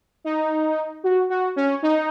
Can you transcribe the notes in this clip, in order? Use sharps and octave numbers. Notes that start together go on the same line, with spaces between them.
D#4
F#4
F#4
C#4
D#4